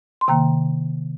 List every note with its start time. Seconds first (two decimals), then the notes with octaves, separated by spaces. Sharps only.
0.21 C6
0.28 C3 D#3 A#3 G5 A#5